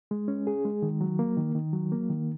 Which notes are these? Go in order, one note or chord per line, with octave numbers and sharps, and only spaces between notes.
G#3
C#4
G#4
G#3
D#3
F#3
A#3
D#3
D#3
F#3
A#3
D#3